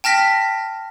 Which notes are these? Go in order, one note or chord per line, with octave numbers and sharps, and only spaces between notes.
G5 A5 F6 A#6 B6